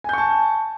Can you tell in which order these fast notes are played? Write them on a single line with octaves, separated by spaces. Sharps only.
G#5 G6 C#6 A5